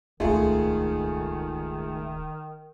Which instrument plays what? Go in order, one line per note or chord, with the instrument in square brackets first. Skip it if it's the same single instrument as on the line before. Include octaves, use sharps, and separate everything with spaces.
[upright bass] D#1 C#2 [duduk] D#3 [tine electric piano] G#3 D#4 F4 [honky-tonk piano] A3 G#4